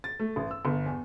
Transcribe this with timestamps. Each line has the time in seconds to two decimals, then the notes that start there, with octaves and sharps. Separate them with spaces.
0.04 A6
0.20 A3
0.36 A1
0.51 E6
0.65 G1
0.86 E2